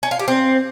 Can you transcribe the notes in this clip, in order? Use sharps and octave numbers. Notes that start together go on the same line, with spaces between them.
C#4
F4
G4
C4